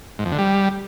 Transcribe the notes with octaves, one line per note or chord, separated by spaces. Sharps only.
G#2
F2
D3
G3